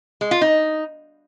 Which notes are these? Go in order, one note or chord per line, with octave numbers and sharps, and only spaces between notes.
G#3
F4
D#4